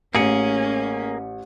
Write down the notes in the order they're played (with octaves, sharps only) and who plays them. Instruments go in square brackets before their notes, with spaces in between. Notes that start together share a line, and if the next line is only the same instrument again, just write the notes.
[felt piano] A1 C#7 [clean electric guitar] A#3 G#4 [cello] C#4